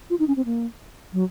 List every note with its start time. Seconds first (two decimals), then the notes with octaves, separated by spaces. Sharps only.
0.10 F4
0.19 D#4
0.28 C#4
0.37 C4
0.45 A#3
1.13 F#3